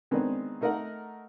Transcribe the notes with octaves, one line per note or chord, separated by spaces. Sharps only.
D#3 G#3 B3 C4 D4 D#4
A3 D#4 A#4 D#5 F#5